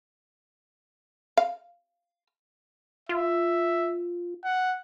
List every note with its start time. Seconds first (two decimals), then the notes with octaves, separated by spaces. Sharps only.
1.37 F5
3.09 F4 E5
4.45 F#5